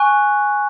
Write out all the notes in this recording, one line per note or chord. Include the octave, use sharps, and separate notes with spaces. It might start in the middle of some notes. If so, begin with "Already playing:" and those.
Already playing: G#5 C#6 F#6